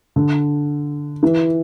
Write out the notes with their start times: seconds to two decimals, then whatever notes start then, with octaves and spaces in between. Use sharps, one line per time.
0.16 D3
1.23 E3